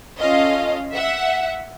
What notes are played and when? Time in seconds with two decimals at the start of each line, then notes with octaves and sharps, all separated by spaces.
0.20 C#4 F4 A4 D#5 F5
0.95 E5 F#5